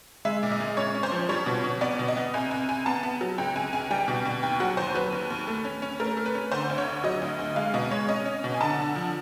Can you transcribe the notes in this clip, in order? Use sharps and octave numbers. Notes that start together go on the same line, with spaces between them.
G#3 E5
A#2
D#5
G#3
C#4 C#5
C#4
C5
F3
G3 C#5
B2
B2
B3 D5
B2
D#5
B3
C2 G#5
C2 G#5
C2 G#5
B3 A5
B3
F#3
C#2 G5
C#2 G#5
C#2 G#5
G3 G5
B2
B2
D#2 G5
F#3 F#5
D#2 C5
F#3 B4
D#2
D#2
A3
C#4
C#4
A3 A#4
A3
B4
C#4
D3 C5
D2
C#5
D3
F#3 D#5
D2
D2
G#3 F5
B2 D#5
G#3 C#5
C#4 D#5
C#4
B2
G#5
D3 A5
D3
F3